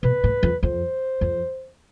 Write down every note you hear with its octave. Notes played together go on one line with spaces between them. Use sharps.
B2 B4
A2
F2
F2 C5
F2